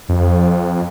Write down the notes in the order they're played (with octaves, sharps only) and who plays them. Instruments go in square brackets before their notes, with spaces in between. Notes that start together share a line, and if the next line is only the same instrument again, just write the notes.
[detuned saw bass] F2